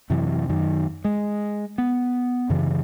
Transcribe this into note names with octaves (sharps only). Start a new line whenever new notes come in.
F#2 C3 E3
F#2 D#3
G#3
B3
F#2 C#3 E3